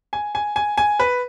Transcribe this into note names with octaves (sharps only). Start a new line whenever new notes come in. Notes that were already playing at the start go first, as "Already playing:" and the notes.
G#5
G#5
G#5
G#5
B4